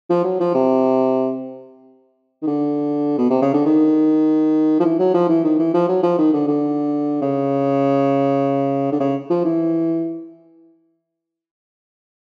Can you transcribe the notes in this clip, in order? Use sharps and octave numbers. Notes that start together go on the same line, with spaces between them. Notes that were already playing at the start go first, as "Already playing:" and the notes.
F3
F#3
F3
C3
D#3
D3
B2
C3
C#3
D3
D#3
F3
E3
F#3
F3
E3
D#3
E3
F3
F#3
F3
D#3
D3
D3
C#3
D3
C#3
F3
E3